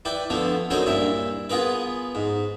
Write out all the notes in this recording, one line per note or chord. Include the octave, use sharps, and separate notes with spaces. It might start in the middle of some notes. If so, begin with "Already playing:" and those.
E4 B4 D5 G5
D3 F3 A3 B3
D3 F#3 C#4 D#4 A#4 C5
G2 A#2 E4 E5
B3 F4 G#4 A#4 B4
G#2